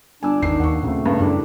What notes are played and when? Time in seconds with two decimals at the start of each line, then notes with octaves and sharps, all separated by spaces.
0.23 G1 D4 G#5 E6
0.43 G#1 E2 D#3 C7
0.60 D#2 F#5 C#6
0.83 A#2 C#3 A3 C4
1.06 G2 C#3
1.20 F#2 C#3 G3 A3 D4 E4 A#4